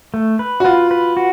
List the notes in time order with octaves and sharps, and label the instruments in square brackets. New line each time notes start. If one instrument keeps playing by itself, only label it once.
[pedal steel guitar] A3
B4
[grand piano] F#4
[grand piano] F4 [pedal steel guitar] B4
[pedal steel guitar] B4
F#4